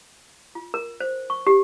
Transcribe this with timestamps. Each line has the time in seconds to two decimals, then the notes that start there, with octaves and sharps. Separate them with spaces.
0.55 F4
0.74 A#4
1.00 C5
1.30 C#6
1.47 G4